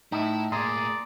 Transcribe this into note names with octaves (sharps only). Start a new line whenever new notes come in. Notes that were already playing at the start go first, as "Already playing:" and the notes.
A2 D#4 E4 E5
A2 A#3 G#4 D5 A#5 C6